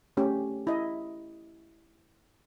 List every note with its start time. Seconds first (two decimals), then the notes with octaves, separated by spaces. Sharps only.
0.17 A3 C#4 G4
0.67 E4 D#5